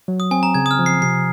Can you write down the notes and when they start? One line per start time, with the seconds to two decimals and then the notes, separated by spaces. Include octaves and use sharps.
0.08 F#3
0.20 D#6
0.31 C4 G#5
0.43 A#5
0.55 C#3 G#6
0.66 D#6
0.71 F6
0.79 F3
0.86 C7
1.02 C3 C7